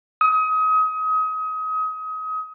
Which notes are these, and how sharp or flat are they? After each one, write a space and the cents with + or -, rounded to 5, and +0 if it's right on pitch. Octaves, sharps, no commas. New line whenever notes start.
D#6 +30